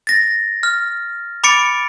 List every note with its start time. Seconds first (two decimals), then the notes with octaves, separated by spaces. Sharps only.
0.07 A6 A#6
0.63 F6
1.44 B5 D6 A6 C#7 D7